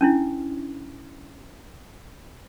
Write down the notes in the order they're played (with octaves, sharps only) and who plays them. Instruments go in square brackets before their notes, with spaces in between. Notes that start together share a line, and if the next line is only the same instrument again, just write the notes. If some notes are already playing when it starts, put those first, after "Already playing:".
[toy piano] C#4 D4 E4